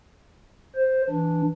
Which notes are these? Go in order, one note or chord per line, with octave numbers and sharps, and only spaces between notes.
C5
E3 D4